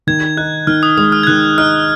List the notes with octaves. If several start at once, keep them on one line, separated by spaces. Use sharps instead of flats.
D#3 G#6
D#4 F#6
D#3 F6
D#6
G#3 D#6
F6
G#6
D#3 F#6
D#4 F6